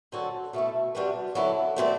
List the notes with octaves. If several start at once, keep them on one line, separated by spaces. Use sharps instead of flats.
D3 F#3 C4 F#4 A4
B2 A3 E4 A4
C3 G3 D4 F#4 B4
D3 F#3 B3 E4 A4
A3 C4 F#4 B4 D5